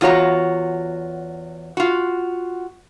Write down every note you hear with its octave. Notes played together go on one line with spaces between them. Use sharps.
E2 F4 F#4 C#5 A#5
F4 F#4